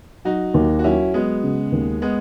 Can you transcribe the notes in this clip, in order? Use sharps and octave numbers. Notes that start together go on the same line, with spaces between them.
F#3 D#4 F#4
D#2
F#4
F#3 C#4 E4
F#3 G#3 B3
C#3
D#2
G#3 B3